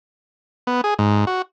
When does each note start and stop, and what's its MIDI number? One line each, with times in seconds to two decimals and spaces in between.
0.67 0.81 59
0.84 0.94 68
0.99 1.25 44
1.27 1.42 66